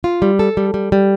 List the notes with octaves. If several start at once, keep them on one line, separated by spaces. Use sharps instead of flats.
F4
G3
A4
G3
G3
G3